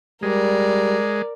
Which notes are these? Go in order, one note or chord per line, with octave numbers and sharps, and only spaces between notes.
G3 G#3 A#4 D5